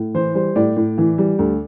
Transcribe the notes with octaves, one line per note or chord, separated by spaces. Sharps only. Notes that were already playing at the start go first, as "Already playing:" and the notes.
Already playing: A2
E3 C5
G3 C5
A2 D5
A2
E3
G3
D2